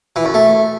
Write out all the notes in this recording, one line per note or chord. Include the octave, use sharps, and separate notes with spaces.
E3
F#2
A3